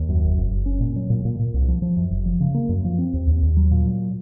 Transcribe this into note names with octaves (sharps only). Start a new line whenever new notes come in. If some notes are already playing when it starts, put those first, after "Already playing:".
Already playing: D#2
F#2
F#1
F#1
F#1
C#4
A#2
F#3
A#2
A#2
A#2
C2
F3
F3
F#2
F#1
F3
C#3
A#3
F#2
F3
C4
D#2
D#2
D#2
F#3
A#2
F#3